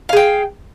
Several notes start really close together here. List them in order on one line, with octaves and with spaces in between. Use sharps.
F5 G#4 G5